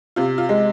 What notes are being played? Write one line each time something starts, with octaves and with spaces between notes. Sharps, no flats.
C3 F4
F4
G#3